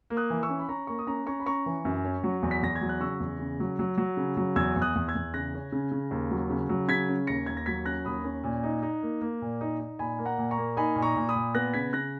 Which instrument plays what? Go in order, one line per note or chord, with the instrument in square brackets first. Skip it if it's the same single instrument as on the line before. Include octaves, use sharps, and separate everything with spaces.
[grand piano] A#3
D#6 F#6
E3
C#6 E6
C#4
B5
C#4 A#5 C#6
A#3 A#5 C#6
D#6
C#4 A#5 C#6
C#4 A#5 C#6
B5
C#4 A#5 C#6
E3
F#2
C#4
F#3
E2
B6
E2 A#6
G#6
F#3
F#6
C#3 C#6 E6
E2
C#3
F#3
F#3
F#3
C#3
F#3
E2 E6 G#6
E2
D#6 F#6
E2
E6 G#6
E2
C#3 F#6 A#6
C#4
C#3
C#3
D#2
F#3
C#3
F#3
C#3 G#6 B6
C#4
D#2 A#6 C#7
D#2 G#6
A#6
F#3 G#6 B6
C#4 F#6 A#6
D#2 B5 D#6
C#4
A#2
D#4
D#4
A#3
A#3
A#2
D#4
D#4
A#2 G#5 B5
A#3
F#5 A#5
A#2
A#5 C#6
A#3
D#4 G#5 B5
A#2
A#5 C#6
A#2
B5 D#6
A#2
B3 F#6 A#6
C#3 G#6 B6
C#3 F#6 A#6